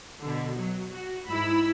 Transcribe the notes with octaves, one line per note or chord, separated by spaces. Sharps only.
B2 D3
F#3
F#4
G#2 E4 B5 E6